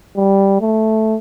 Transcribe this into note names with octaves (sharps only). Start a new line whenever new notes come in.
G3
A3